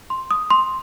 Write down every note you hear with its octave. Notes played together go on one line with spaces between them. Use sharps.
C6
D#6
C6